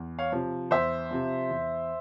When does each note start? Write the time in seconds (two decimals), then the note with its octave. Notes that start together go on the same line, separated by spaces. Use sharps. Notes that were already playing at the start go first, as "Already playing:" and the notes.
Already playing: E2
0.19 C#5 F5
0.32 C3 F3
0.71 E2 C5 E5
1.11 C3 F3
1.50 E2